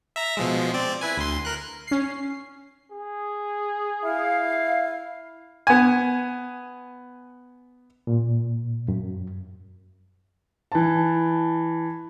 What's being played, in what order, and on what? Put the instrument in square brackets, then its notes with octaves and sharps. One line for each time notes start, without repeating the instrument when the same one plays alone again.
[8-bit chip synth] E5 A#5
B2 F3 G#3
C4 D5
E4 B4 G#5
D2 C6
A#4 F#6
[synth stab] C#4 C7
[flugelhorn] G#4
[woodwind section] E4 F5
[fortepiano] B3 G#5
[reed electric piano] A#2
F#2
[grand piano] E3 A5